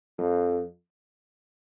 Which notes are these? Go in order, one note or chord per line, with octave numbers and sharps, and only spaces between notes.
F2